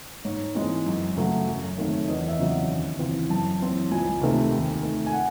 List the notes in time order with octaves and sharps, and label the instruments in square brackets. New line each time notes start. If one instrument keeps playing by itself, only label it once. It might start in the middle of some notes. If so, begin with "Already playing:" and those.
[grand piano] G#2 C#5
E3 G#3 C4
F#2
C#3 F#3 A3
F#2
D#3 A3 C4
E2 D#5
E5
C#3 F#3 C4
D#2
C#3 E3 C4
F#2 A5
E3 C4
C#2 G#5
C3 D#3 A3 C4
D#2
D#3 A3
G#5
F#5